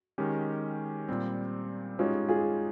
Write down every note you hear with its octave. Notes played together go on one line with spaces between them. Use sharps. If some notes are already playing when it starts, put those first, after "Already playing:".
D#3 G#3 C#4 G4
A#2 G3 C4
G#3 C#4 D#4 F4 G4
F4 G#4